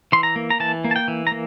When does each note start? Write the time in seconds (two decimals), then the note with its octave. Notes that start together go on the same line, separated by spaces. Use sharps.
0.12 E3 C6
0.23 A#5
0.36 A#3
0.50 A#5
0.60 E3 A5
0.84 A#3
0.91 A5
0.96 G5
1.08 E3
1.27 A#5
1.32 A#3